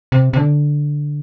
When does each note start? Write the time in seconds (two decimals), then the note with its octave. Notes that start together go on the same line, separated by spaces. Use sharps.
0.12 C3
0.33 C3
0.37 D3